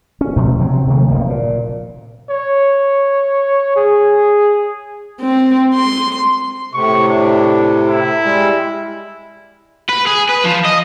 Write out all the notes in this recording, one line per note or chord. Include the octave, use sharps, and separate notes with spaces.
C#4
B2 F3 F#3 A3
C3 F3 F#3 C4
C3 D#3 A3 A#3
F1 F2 F3 A#3
A#2
C#5
G#4
C4
C6
A2 C3 C#6
D4
E4
G3 G#3
B4
G#4
B4
F3
D#5